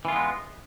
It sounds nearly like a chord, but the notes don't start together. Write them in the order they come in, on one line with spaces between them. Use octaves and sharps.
E3 F4 B3 G#3